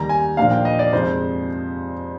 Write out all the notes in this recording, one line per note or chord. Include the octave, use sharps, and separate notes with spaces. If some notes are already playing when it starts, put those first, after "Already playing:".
Already playing: D#2 D#3 G3 A#5
G#5
A#2 F3 A#3 D4 F5
G5
D#5
D5
F2 C3 F3 G#3 C5